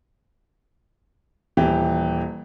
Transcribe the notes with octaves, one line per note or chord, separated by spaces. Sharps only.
D#1 E3 G4